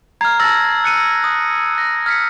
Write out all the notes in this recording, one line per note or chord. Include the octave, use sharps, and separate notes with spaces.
A#5 F6 G#6 C7
A5 A#5 E6 A6 A#6
F#6 C#7 D#7
D#6
A#6
F6 G#6 B6 C#7